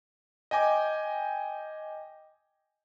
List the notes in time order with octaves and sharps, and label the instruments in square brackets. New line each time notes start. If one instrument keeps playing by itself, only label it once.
[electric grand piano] D#5 G5 G#5 D6